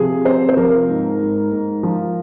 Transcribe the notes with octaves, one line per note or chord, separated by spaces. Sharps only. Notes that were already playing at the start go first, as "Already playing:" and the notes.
Already playing: C3 F3 G#4
C4 C5
C5
F3 A#4
G#2
G#2
G#2
F3